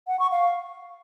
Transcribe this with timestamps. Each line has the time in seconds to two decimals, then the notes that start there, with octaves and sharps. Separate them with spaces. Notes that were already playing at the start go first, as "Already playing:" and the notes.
0.07 F#5
0.19 C#6
0.31 F5